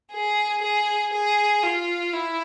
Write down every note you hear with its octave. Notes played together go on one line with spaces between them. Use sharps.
G#4
G#4
G#4
F4
E4